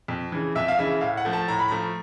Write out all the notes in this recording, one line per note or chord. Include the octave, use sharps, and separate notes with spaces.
F2
C#3 E3
F2 E5
F5
C#3 E3 E5
A2 F5
F#5
F3 A3
A5
A2 A#5
B5
F3 A3 A#5